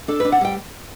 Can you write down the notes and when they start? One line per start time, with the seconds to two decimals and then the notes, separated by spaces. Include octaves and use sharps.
0.08 D4 A4
0.20 D4 B4
0.32 F#5
0.41 G3 G5